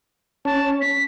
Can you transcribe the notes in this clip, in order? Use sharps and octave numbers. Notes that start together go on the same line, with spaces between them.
C#4 A5
B6